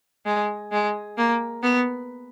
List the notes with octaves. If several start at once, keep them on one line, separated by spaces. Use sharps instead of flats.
G#3
G#3
A#3
B3